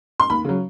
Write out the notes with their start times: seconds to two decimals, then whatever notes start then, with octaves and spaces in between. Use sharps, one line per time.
0.20 C6
0.30 D#2 B5
0.45 C#3 F#3